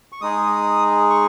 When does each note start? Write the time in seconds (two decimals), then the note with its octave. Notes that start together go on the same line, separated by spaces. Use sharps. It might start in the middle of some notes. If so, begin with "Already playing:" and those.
0.12 C#6
0.21 G#3 D#4 G#4 D#6
1.10 C#6